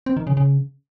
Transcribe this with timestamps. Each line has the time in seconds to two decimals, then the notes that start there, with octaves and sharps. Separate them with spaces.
0.06 C4
0.17 D#3
0.27 C#3
0.37 C#3